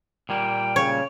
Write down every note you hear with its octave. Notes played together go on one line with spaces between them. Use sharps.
A#2 G3 A#3 G5
C#3 C#5